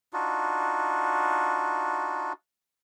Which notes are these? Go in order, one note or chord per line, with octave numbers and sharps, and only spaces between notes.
D4 D#4 F4 F#4